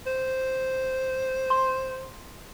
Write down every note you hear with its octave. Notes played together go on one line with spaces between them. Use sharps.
C5
C6